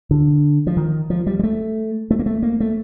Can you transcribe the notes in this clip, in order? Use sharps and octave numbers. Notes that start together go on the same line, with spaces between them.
D3
F3
D#3
F3
G3
G3
A3
A3
A#3
A3
A#3
A3